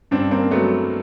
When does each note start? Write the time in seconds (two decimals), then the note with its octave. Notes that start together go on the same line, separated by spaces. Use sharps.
0.11 G2 C4 D4
0.31 A#3 C4
0.51 F#3 A3 B3